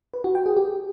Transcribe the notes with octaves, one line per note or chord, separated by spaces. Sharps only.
B4
F#4
G5
G#4
G4